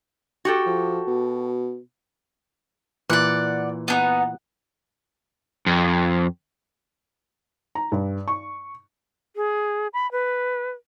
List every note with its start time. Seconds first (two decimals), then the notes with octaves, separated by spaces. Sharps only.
0.45 F#4 G4 A4
0.66 F3
1.07 B2
3.10 A#2 E3 D5 F#5
3.88 B3 D4 D#4 F#5
5.66 F2
7.75 A#5
7.92 G2
8.28 C#6
9.36 G#4
9.94 B5
10.12 B4